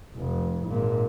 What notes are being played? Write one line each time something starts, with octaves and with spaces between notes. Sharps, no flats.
F1
G#1 A#2